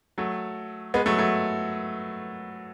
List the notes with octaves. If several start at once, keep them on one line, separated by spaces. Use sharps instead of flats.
F#3 A3
G#3 B3
F#3 A3
F#3 A3